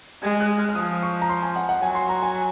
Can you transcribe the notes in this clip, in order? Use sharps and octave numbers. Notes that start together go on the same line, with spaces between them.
G#3 G#6
F#6
F6
F6
F3 D#6
C#6
A#5
C6
G#5
F#5
F#5
F#3 G#5
C6
A#5
G#5